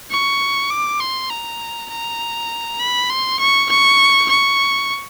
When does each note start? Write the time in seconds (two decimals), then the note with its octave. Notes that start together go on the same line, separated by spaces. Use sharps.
0.11 C#6
0.70 D6
1.00 C6
1.30 A#5
1.90 A#5
2.79 B5
3.10 C6
3.40 C#6
3.70 C#6
4.29 C#6